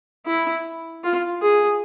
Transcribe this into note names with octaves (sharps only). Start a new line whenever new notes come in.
E4
F4
G#4